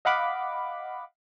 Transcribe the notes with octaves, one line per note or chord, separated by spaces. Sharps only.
D#5 F5 F#5 B5 D6